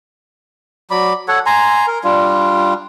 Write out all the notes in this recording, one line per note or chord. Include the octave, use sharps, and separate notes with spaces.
F#3 D5 B5
A4 C#5 F#5
G#5 A#5 C6
A#4
G3 D4 F4